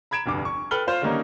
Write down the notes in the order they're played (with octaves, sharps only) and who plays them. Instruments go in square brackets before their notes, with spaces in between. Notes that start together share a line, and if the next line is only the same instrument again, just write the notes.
[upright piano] A#5 B5 G#6 D7 E7
F1 D2 G2 D6
C#6
A4 B4 G5 F6 F#7 G7
F4 C5 F5
D3 D#3 G3 A#3 C#4 D#4